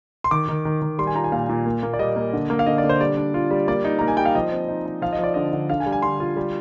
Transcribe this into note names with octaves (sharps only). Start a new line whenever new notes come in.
C6
D#3 D6
D#3
D#3
D#3
G3 C6
G#5
F4 A#5
G#5
A#2 F5
A#2
A#3
A#3
D5
G3 D#5
A#3
D3
A#3
F5
D3 D#5
D5
D3
C5
G3 D5
D4
F4
G3
A#3 D5
D#4
A#3 A#5
G#5
G3 G5
F5
F3 D#5
C4
D#4
D#4
F3 F5
D#5
F3 D5
D3 D#5
D3
D3 F5
G#5
G3
G#5
D3 C6
F4
G3